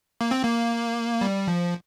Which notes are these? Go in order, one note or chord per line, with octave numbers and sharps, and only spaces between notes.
A#3
C4
A#3
G3
F3